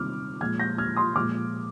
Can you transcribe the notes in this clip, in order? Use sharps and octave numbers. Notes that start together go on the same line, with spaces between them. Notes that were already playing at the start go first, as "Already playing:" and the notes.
Already playing: C3 D#3 G3 D6 F6
A#2 F3 G#3 F6 G#6
G6 A#6
F6 G#6
C6 D#6
A#2 F3 G#3 D6 F6